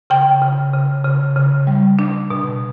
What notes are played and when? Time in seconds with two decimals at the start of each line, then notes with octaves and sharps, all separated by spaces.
0.10 C#3 G5
0.42 C#3
0.74 C#3
1.05 C#3
1.36 C#3
1.67 G3
1.99 D4
2.30 B2